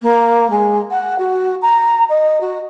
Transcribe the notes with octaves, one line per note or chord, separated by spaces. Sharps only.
A#3
G#3
F#5
F#4
A#5
D#5
F#4